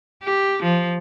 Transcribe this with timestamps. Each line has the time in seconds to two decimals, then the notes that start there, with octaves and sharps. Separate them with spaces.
0.23 G4
0.63 F3